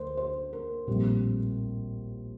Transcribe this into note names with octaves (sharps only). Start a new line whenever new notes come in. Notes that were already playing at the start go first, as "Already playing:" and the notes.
Already playing: D2 D3 A3 A#4 C5
C5
A#4
A#1 A2 G3 C4